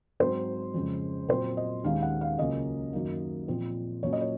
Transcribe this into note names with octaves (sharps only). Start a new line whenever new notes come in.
G#2 F#3 C4 C5
F2 C#3 G#3
A#2 F#3 C4 C5
D#5
D#2 D#3 G#3 C#4 F5
F#5
F5
C#2 C#3 F#3 A#3 C#4 D#5
F#2 D#3 A#3
A#2 F3 C4
A#2 F#3 A#3 C#4 C#5
D#5
C#5